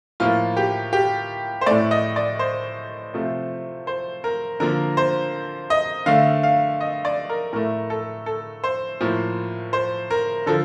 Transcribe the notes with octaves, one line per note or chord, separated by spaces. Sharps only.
A2 F3 A#3 F4
G4
G4
C5
A2 A3 D5
D#5
D5
C5
C3 F3 A3
C5
A#4
D3 F3 A#3 A#4
C5
D#5
D3 A3 F5
F5
D#5
D5
A#4
A2 A3 A#4
A4
A4
C5
A2 F3 A#3
C5
A#4
D3 F3 A4